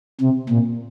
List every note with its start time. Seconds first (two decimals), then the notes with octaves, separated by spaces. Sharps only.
0.21 C3
0.50 A#2